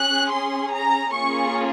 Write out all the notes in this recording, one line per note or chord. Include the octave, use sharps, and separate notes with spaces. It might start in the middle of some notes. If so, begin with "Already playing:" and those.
Already playing: C#4 G#4 F#6
C6
A#5
A#3 C#4 F4 G#4 C#6